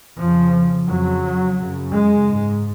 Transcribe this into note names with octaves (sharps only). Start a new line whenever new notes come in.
F2 C#3 F3
F2 C#3 F#3
F#2 C#3
G#3
G#2